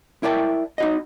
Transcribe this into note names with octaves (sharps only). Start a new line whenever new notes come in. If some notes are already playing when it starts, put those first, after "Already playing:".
E4 A#4 D5 G5 A5
D#4 F#4 D#5